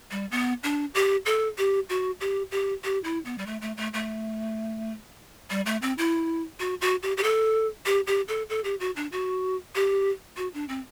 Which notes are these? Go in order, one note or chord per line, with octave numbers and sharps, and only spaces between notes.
G3
B3
D4
G4
A4
G4
F#4
G4
G4
G4
E4
B3
G3
A3
A3
A3
A3
G3
A3
C4
E4
F#4
F#4
G4
G4
A4
G4
G4
A4
A4
G4
F#4
D4
F#4
G4
F#4
D4
C4